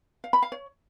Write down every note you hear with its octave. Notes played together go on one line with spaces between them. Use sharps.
F5
B5
F5
C#5